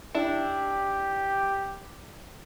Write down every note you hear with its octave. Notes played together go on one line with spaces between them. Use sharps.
D4 E4 G4